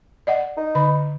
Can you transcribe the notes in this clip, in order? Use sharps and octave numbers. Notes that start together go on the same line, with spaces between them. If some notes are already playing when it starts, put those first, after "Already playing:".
D5 D#5 F#5
D#4
D3 B5